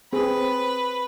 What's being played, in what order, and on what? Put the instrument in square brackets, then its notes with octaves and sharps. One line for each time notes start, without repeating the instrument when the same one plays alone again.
[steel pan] C4 G#4 C5 [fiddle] B4